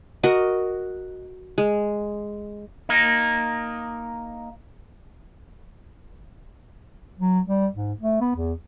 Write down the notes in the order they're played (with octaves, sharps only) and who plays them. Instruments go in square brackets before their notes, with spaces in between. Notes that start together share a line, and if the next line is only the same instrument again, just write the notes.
[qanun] F#4 A#4 D#5
G#3
[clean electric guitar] A#3 D#4
[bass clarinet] F#3
G3
G#2
A3
B3
E2